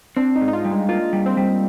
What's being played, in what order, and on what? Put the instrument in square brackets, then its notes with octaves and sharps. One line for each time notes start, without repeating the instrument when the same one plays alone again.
[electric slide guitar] C4 [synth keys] D4
[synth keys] D#4
[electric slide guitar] G#2
[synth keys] D#4
F4
[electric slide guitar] G3
[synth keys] G#3
[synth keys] A#3 [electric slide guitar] F4
[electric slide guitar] G3
[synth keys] C4
[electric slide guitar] G3